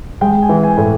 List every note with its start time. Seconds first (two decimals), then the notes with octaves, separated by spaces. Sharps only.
0.21 G#3 G5
0.42 G#5
0.49 E3
0.64 G#5
0.77 A2